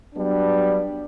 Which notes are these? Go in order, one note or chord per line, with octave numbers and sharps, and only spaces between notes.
F#3 G3 B3 D4